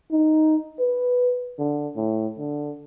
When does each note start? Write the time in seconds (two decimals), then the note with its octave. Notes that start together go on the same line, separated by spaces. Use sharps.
0.11 D#4
0.79 B4
1.59 D3
1.96 A2
2.38 D3